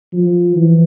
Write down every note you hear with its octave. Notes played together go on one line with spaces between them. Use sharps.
F3
E3